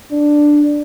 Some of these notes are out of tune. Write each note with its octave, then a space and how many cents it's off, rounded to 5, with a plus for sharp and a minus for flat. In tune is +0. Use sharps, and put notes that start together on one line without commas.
D4 +5